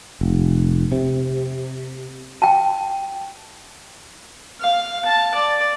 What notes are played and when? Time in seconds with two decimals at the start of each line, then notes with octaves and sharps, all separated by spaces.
0.21 F1
0.92 C3
2.42 G5 A5
4.61 F5
5.05 A5
5.35 D5